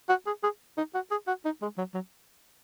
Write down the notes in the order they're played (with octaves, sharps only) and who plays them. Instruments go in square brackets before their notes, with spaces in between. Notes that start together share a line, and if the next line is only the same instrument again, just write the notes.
[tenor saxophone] F#4
G#4
G#4
D#4
F#4
G#4
F#4
D#4
G#3
F#3
F#3